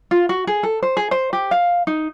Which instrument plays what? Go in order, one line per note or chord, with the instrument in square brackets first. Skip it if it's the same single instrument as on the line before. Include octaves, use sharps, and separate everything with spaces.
[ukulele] F4
F#4
G#4
A4
C5
G#4
C5
G4
F5
D#4